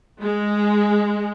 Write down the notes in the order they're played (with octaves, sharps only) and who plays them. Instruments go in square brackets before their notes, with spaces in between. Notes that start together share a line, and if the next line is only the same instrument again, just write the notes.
[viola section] G#3